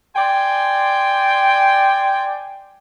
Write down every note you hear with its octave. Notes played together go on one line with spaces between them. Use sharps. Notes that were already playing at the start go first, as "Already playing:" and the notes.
D5 G5 G#5 C6